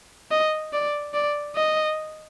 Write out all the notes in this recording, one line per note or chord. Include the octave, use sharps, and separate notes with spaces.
D#5
D5
D5
D#5